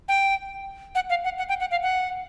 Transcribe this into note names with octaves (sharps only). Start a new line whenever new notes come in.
G5
F#5
F5
F#5
F#5
G5
F#5
F5
F#5